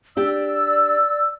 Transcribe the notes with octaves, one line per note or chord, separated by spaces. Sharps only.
D4 G4 D5 E6